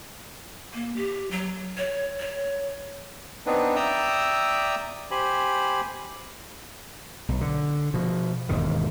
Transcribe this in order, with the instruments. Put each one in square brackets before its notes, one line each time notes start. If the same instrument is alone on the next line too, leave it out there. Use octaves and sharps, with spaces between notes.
[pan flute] A#3
G4
F#3
C#5
C#5
[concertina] B3 C4 D4 D#4 B4
D5 E5 G5 A#5 D#6 E6
G4 C5 G#5 B5
[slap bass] B1
D3
B2 F3
E1 D#2 G#2 D#3